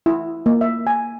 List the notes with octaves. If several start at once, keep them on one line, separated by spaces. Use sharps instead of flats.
E4
A#3
E5
G#5